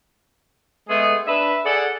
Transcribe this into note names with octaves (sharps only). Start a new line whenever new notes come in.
G#3 A3 B3 G#4
D4 B4 E5
G#4 A4 D5 F#5